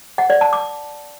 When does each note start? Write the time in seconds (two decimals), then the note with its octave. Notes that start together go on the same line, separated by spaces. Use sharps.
0.18 F#5
0.30 D5
0.41 A5
0.53 D6